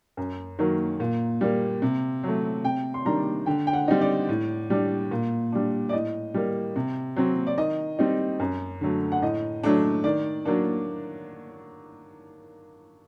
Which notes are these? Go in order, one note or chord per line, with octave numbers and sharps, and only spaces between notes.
F#2
D#3 F#3 A#3
A#2
G3 A#3
C3
F#3 A3
C3 G5
C6
D#3 G3 D4 A#5
D3 G5
G5
F#5
G3 C4 D#4
D5
A2
G3 D4
A#2
G3 D4
D5
A2 D#5
G3 A#3
C3
F#3 C4
D5
D#3 D#5
G3 C4 D#4
F#2
D3 F#3 A3
F#5
A2 D#5
F#3 A3 D4
D#3 D5
F#3 A#3 D4